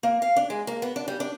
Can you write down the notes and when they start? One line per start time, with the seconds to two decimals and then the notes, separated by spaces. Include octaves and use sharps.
0.03 A#3
0.22 F5
0.36 D4
0.50 G#3
0.67 A#3
0.82 B3
0.96 D4
1.08 G3
1.20 D4